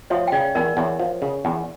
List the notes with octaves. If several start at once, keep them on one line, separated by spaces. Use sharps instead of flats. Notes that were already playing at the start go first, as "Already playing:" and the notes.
F3 C#5 E5
G5
C#3 D5 F5
E2 A#4 D5
E2 C#5 E5
F3
C#3
E2